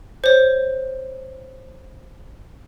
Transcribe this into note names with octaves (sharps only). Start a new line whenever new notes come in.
C5 C#5